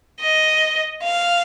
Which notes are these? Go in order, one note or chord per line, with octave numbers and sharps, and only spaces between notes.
D#5
F5